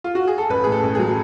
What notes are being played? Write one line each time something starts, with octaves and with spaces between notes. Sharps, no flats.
F4
F#4
G#4
A4
A1 B4
A2 G#4
A4
A1
F#3 G#4